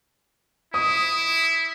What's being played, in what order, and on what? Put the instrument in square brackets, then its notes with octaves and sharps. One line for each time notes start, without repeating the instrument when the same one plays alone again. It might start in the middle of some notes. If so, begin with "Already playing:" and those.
[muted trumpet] E4 [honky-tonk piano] D#6